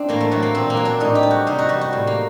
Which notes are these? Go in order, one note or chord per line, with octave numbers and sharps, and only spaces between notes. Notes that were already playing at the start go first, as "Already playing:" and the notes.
Already playing: C4 D4
A2 A#3
A3
F#3 A3
A#3
A#2 C4
A#3
F#3
D4
A2 D#4
G4
G3
F#4
C3 D#4
F#4
G3 F#4
F#4
A2
A#3